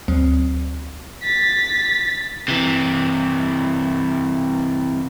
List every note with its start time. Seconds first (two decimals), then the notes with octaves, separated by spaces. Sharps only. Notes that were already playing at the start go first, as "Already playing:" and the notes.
0.08 D2 F#3 C4
1.23 A6 B6
2.48 C3 E3